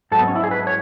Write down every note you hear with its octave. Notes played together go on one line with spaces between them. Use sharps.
G#2 F#3 A4
B3
C#4
E4
G#4
B4
C#5